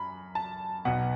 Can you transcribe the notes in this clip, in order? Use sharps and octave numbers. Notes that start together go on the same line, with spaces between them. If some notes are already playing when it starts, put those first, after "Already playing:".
Already playing: F#2 B5
A5
B1 B2 B3 F#5